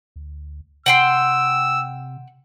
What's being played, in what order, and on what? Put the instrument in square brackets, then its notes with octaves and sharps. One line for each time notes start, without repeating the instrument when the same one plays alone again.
[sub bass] D2
[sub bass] C3 [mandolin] F#5 G5 C6 [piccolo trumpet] E6